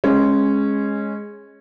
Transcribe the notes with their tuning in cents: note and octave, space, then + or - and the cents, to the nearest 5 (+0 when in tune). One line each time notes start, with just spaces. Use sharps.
G#3 +0 C#4 -15